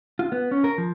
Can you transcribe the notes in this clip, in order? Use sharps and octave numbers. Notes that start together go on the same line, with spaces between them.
F4
B3
C#4
A#4
F3